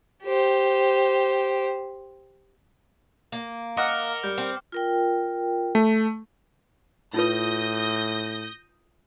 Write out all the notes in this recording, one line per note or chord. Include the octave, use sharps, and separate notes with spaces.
G4 C5
A#3
A#4 D#5 F#5 D6 F6 C#7
G3 G6
C4
F4 A#4 G5
A3
A2 D#4 F4 B4 D#6 G6 A#6